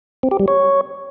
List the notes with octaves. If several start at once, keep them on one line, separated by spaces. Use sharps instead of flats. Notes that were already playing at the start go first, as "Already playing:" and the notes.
C4
G4
G3
C#5